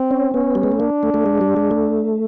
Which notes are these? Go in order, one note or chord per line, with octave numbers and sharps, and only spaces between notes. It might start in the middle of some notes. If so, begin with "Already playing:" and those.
Already playing: C4
C#4
B3 C#4
G3
G#3
A3
A#3 D4
A3
A3
G#3
G3
G#3
A3